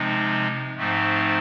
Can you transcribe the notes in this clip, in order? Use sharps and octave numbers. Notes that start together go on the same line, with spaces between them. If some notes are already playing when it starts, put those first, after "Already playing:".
Already playing: C3 F3 G#3 C4 D#4
G#2 F3 A3 C4 D#4